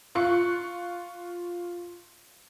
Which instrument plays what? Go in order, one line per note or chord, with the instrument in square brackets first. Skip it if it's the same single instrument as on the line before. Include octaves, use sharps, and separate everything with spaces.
[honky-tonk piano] F4 C#6 F#6 C#7